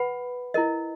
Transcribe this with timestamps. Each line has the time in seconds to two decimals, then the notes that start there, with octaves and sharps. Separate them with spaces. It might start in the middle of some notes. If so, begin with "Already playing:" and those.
Already playing: B4 F#5 B5
0.54 E4 A#4 D#5